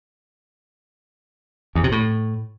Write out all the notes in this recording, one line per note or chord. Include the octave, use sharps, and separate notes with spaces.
E2
C3
A2